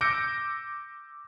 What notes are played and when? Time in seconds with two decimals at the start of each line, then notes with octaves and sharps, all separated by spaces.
0.01 D6 E6 G6 A#6 C#7 D7